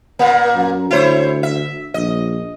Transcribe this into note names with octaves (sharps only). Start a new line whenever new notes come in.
A#2 A#3
F#2
D2 E4 C5 C#5
E5
A#1 D#5